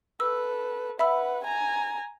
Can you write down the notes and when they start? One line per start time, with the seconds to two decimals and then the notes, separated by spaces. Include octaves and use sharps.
0.20 A4 B4 E6
0.99 B4 E5 F#5 B5 E6
1.44 G#5 A#5